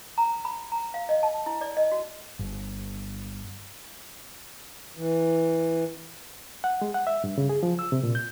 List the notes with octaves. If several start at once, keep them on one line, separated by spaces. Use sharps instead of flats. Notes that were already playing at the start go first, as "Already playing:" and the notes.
A#5
B5
A#5
F5
D#5
A5
E4
D5
D#5
F#4
G1
E3
F#5
G#3
F#5
E5
G2
C#3
G#4
F3
E6
C3
A#2
G6